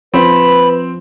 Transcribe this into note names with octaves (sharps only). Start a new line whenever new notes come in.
F3 C4 B4 B5